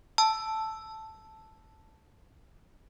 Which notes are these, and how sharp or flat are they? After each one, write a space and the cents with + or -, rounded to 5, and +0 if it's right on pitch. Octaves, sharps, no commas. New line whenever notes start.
A5 +0 E6 +0